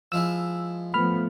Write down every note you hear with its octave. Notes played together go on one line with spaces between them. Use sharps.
F3 G#3 E4 E6
F3 A3 B3 B5 F6